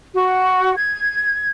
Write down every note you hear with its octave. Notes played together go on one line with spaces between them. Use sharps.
F#4
G#6